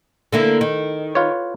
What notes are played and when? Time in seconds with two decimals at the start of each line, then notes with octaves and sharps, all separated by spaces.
0.33 D3 A#3 E4
0.61 D#3
1.15 F4 B4 C#5